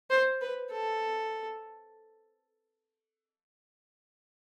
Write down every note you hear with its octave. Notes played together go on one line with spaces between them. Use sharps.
C5
B4
A4